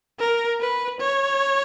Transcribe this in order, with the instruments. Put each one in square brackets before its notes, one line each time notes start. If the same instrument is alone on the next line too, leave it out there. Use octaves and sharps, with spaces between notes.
[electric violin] A#4
B4
C#5